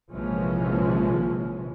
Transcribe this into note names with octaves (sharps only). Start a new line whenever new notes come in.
A#1 C3 E3 F3 G#3 C#4